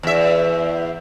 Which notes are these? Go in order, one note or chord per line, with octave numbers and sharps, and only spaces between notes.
E2 E5